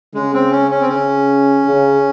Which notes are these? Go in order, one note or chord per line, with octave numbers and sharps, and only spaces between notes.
C#3 G#3
C4
C#4
C#4
C4
C#3 C#4
C#3